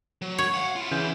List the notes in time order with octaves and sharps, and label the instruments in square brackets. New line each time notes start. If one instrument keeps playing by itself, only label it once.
[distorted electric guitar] F#3
[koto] C#5
[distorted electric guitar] F5 F#5
E4 F4
[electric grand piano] C#3 E3 G6